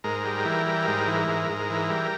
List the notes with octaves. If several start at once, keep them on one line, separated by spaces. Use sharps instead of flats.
G#2 A#4
G3
E3
G3
G#2
E3
G#2
G#2
E3
G3